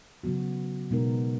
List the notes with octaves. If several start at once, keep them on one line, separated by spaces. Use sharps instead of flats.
C#3 F#3 B3 F#4
B2 G#3 B3 D#4 A#4